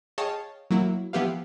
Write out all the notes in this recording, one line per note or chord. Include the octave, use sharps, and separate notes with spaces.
G#4 C#5 D#5 F5 G5 A5
F#3 A#3 E4
F3 B3 E4 G4 B4 F5